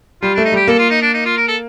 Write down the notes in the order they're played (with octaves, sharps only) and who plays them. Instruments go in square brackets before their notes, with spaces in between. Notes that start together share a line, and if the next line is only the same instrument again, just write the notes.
[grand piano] G3 [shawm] F4
[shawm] D4
[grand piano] A3
[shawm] D#4
[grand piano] G3 [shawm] G4
[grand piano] A#3 [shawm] A4
[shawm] F4
D#4
D4
D#4
F4
A#4
A4